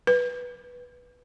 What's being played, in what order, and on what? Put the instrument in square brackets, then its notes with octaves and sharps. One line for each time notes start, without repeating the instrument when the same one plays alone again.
[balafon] B4